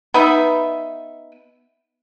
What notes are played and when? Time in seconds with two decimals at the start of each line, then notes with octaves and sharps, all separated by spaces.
0.14 B3 D#4 E5